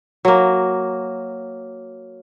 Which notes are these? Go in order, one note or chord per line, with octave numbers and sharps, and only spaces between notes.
F#3 A#3